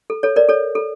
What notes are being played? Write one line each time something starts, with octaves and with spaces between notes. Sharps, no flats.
A4
A4 C#5
A#4 D5
A4 C#5
A4